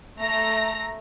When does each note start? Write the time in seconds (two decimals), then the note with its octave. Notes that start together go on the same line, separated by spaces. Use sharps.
0.19 A3 A#5 A#6